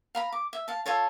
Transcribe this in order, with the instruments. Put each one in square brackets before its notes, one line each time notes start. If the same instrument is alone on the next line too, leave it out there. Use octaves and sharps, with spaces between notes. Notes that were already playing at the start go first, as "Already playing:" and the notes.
[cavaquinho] F5 A#5 B5
D6
E5
F5 A5
F4 A4 C#5 A5